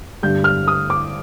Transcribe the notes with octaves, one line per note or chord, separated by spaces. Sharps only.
G2 D3 G3 G6
F6
D#6
D6